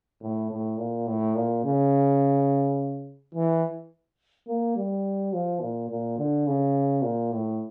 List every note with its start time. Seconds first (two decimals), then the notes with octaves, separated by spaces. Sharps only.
0.22 A2
0.50 A2
0.78 A#2
1.07 A2
1.35 A#2
1.64 C#3
3.35 E3
4.48 A#3
4.76 G3
5.33 F3
5.61 A#2
5.90 A#2
6.18 D3
6.47 C#3
7.03 A#2
7.32 A2